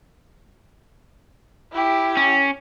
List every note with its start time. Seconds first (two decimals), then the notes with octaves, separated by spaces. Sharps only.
1.72 E4 G4
2.17 C#4